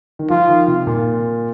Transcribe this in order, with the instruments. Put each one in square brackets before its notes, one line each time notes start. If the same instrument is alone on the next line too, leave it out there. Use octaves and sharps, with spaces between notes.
[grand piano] D#3
[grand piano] F3 [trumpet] F4
[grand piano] D#3
C3
A#2